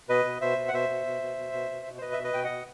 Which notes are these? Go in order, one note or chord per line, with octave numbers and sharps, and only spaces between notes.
B2 B4 D#5
B2
B2 C5 E5
B2
F#5
B2 C5 E5
B2
B2
B2
B2
B2
B2
B2
C5
B2 B4 D#5
B2 E5
B4 D#5
B2 G5
D#5 F#5
B2